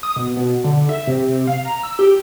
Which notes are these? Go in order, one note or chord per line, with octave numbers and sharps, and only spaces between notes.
D#6
B2
B2
D3
E5
C3
C3
F5
A#5
E6
G4